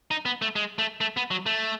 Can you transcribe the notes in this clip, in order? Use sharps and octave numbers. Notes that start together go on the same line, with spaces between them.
D#4
B3
A3
G#3
A3
A3
B3
F#3
A3